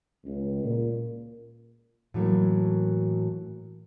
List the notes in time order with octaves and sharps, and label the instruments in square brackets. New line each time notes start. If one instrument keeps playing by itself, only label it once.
[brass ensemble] C#2
A#2
[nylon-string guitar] A2 E3 F#3 A3 A#3